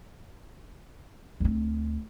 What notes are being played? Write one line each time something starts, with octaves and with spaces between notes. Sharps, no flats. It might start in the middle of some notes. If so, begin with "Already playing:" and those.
D2 C4